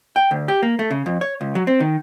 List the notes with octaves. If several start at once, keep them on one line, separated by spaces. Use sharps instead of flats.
G5
D2
G4
A#3
A3
C#3
F2
C#5
C#2
F#3
C4
D#3